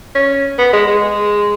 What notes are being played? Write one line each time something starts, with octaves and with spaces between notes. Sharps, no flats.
C#4
B3
G#3
G#3